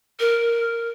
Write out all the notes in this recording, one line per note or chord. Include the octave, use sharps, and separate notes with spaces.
A#4